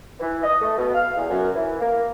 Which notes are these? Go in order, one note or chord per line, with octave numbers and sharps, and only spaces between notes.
E3
D#5
A3
B2
F5
E2
F#2
E3
A#3